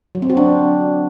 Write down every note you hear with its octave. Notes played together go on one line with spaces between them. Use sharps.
F#3
C4
F#4
D4